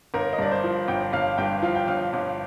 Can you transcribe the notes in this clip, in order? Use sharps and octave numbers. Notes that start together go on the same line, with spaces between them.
G1 A#4
D#5
G2 D5
C5
F3
G1 G5
G1 F5
G2 G5
F3 F5
G5
G1 F5
G1